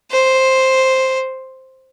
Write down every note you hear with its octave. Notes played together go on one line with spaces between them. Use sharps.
C5